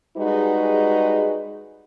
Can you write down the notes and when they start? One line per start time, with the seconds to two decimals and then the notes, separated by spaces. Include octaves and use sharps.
0.17 G3 G#3 D#4 F#4 G#4 B4